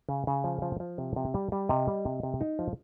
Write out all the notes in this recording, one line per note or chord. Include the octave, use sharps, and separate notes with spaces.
C#3
C#3
F3
F3
F3
C3
C3
G3
G3
C3 D#5
G3
C3
C3
D#4
F3